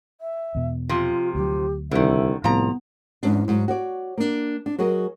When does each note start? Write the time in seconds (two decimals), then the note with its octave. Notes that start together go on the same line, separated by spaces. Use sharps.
0.21 E5
0.55 E2 B2
0.89 C3 F3 F4
1.35 D2 F#3 G4
1.91 C2 D3 D#3 E5
2.44 C2 A2 F3 B3 A#5
3.23 E2 G#2 C#4 D4
3.48 G#2 F#3
3.68 F#4 C#5 D5
4.17 A#3 D4
4.66 D4
4.78 F#3 F#4 G#4 A#4 D#5